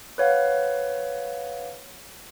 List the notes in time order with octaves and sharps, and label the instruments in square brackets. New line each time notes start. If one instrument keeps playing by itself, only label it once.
[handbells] B4 C#5 F5 F#5